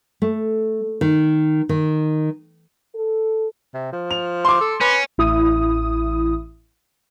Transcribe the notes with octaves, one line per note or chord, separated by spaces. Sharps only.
A3
D#3
D#3
A4
C3
F3
F7
C6 D6
A4
C#4 B4
A1 E4 D#6